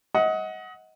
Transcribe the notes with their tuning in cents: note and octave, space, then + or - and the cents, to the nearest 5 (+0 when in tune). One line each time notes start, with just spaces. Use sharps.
D#5 +30 F#5 +0